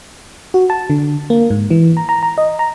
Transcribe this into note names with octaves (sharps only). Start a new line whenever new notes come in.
F#4
A5
D3
A#3
G#2
E3
A#5
A#5
A#5
D#5
A#5